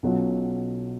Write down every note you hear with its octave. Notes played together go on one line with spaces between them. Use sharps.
B1 B2 F#3 C#4 F4